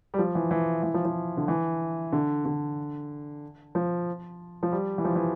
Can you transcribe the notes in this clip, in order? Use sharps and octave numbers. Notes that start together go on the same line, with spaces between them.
G3
F3
E3
E3
E3
F3
F3
D3
E3
D3
D3
F3
F3
G3
E3
F3
E3